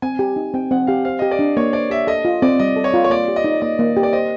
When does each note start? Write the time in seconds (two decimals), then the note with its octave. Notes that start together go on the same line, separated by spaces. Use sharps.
0.02 C4 G#5
0.19 G4
0.36 D#4
0.54 C4 G5
0.71 C4 F#5
0.87 G4 F5
1.05 C5 F5
1.19 G4 D#5
1.31 D5
1.39 D4
1.57 A#3 C#5
1.73 C5 D5
1.90 G4 E5
2.07 A4 D#5
2.25 F4
2.42 C4 D5
2.59 G3 D#5
2.76 A4
2.84 C#5
2.94 F4
3.04 C#5
3.10 A#3 D5
3.28 G4
3.36 D#5
3.44 D#4
3.62 A#3 D#5
3.79 A#3
3.97 G4
4.03 D5
4.13 C5 D#5